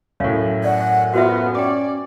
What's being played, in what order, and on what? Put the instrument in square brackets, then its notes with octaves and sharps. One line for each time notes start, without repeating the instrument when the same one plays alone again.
[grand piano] F#2 A2 [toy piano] C#5 F5
[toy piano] D5 [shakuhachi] F#5
[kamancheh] B3 [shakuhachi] F4 [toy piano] F#4 C5 E5
[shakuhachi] C#4 [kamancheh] D5 [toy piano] G5 D6